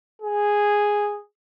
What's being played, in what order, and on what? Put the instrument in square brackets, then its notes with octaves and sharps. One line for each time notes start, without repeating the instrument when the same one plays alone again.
[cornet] G#4